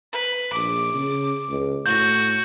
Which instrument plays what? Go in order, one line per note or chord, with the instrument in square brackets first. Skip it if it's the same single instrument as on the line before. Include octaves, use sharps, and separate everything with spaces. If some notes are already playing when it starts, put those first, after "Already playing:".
[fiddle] B4
[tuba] A#1 [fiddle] D6
[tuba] C#3
C#2
[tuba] A2 [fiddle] F#4 [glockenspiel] G6